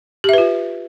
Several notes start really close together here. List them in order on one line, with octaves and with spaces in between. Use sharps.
G4 E5 B4 F4